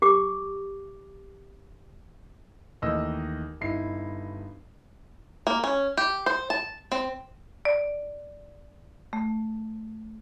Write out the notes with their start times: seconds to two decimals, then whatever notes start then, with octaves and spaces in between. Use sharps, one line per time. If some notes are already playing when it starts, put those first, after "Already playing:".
0.02 G4 D6
2.82 D#2 D#3 E3 A3 D#5 E6
3.61 G1 D#4 E4 C7
5.47 A#3
5.64 C#4
5.97 G4
6.26 C5
6.50 A5
6.92 C4
7.65 D5
9.13 A3